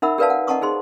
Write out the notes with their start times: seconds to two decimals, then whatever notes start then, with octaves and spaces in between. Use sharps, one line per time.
0.02 D#4 A#4 E5 F#5 B5 E6
0.18 G4 A#4 B4 D5 F5 A5
0.30 F#5
0.47 D#5 F#5 A5 A#5 C#6 D#6
0.62 D#4 G#4 C5 C6